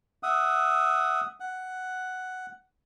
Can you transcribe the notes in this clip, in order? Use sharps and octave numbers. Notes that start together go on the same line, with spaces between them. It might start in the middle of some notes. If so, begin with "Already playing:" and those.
E5 F#5 D#6
F#5